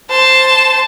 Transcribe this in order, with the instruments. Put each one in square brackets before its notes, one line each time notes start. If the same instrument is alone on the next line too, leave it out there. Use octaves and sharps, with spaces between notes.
[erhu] C5 [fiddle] A5